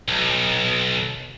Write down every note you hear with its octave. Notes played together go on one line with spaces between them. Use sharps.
B1